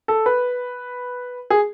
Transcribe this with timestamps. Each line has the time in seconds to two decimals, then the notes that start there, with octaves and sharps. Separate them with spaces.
0.08 A4
0.26 B4
1.50 G#4